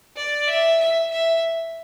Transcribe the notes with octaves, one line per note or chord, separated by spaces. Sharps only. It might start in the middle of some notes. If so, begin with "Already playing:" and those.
D5
E5
E5
E5